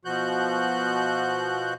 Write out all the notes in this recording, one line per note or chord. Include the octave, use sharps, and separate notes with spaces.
B2 F3 F#4 F#6 G6